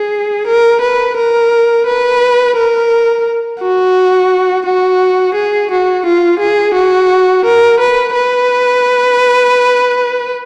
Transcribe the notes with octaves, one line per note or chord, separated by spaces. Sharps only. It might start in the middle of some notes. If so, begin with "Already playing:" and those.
Already playing: G#4
A#4
B4
A#4
B4
A#4
F#4
F#4
G#4
F#4
F4
G#4
F#4
A#4
B4
B4